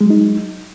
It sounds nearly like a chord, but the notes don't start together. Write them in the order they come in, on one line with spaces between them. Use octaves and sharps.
G#3 F#3 D#4